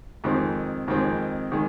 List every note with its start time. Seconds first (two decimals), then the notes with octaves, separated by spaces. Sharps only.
0.24 F2 D#3 G#3 C4
0.88 F2 D#3 G#3 C4
1.52 D#3 G#3